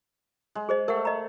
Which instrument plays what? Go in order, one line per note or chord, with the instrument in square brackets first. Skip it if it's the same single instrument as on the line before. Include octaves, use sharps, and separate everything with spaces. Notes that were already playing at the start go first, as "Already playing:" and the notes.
[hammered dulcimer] G#3
[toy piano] G#4 C5 D#5
[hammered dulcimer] A3 [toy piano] A#4 F#5
[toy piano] D#5 A#5